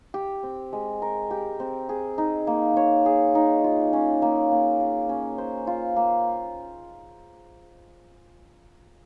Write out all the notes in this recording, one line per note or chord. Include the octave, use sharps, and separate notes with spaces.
G4
C4
G#3
A#4
G4
C4
G#4
D#4
A#3
C#5
G#4
D#4
F4
C#4
A#3
A#3
F4
C#4
C5
F4
A#3